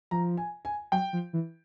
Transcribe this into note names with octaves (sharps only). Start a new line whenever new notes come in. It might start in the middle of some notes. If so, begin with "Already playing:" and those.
F3 A#5
G#5
G#5
F#3 G5
F3
E3